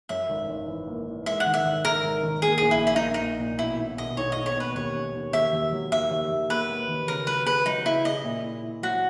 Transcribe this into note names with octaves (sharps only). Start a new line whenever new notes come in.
F#2 E5
G#1
G#1
E3
A#3
E3
G#3 E5
F#5
D#3
E5
G#1
G#1 A#4
G#1
D#3
A#3 G#4
A#1 G#4
E4
A#2
E4
D#4
A#3
D#4
A#1
A#2
B2 E4
B1
B2 D#5
B1 C#5
B1 D#5
C#5
B2 B4
D#2 C#5
C#4
D#2
D#2 E5
D#2
F#3
D#2 E5
D#2
D#2
A#3 B4
A#3
D#3
C#3 A#4
F#3 B4
G#4 B4
F#3 D#4
C#3 E4
G#4 D#5
A#2
E4
E4
F#3 F#4